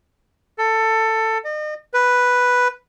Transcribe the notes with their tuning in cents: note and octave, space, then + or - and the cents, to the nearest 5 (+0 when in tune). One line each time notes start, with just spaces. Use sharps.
A4 +15
D#5 -40
B4 +0